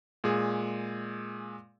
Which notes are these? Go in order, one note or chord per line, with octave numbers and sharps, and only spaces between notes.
A#2 G#3 G#4